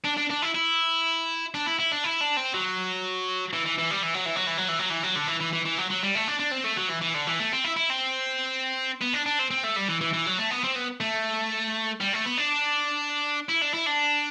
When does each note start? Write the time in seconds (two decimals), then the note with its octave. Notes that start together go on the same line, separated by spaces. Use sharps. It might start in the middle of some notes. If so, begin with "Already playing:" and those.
0.05 D4
0.17 D4
0.30 D4
0.42 E4
0.55 E4
1.55 D4
1.66 E4
1.80 E4
1.92 D4
2.04 E4
2.21 D4
2.37 C4
2.54 F#3
3.53 E3
3.66 E3
3.78 E3
3.91 G3
4.03 E3
4.14 F#3
4.26 E3
4.36 F#3
4.47 E3
4.58 F#3
4.69 E3
4.79 F#3
4.90 E3
5.03 F#3
5.16 D3
5.28 E3
5.40 E3
5.53 E3
5.65 E3
5.78 F#3
5.90 F#3
6.03 G3
6.15 A3
6.28 D4
6.40 D4
6.52 C4
6.65 A3
6.77 F#3
6.90 E3
7.02 E3
7.15 D3
7.27 E3
7.39 A3
7.52 C4
7.64 E4
7.76 E4
7.90 C4
9.02 B3
9.14 D4
9.26 D4
9.39 C4
9.51 C4
9.64 A3
9.76 G3
9.88 E3
10.01 E3
10.13 E3
10.26 F#3
10.38 A3
10.51 B3
10.64 C4
10.75 B3
11.00 A3
12.00 G3
12.13 A3
12.25 B3
12.37 D4
13.49 E4
13.62 D4
13.74 E4
13.87 D4